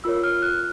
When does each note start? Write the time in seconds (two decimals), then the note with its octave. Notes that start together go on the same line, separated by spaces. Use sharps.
0.04 F4 A#4 C#5 E6
0.24 F6
0.42 F#6